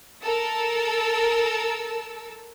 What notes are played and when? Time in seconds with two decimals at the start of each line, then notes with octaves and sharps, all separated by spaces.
0.23 A4 A#4 A5 E6